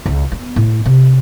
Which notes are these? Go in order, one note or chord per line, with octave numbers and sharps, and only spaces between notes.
C#2
B3
A2
C3